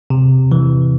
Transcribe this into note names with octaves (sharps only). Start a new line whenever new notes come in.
C3
E3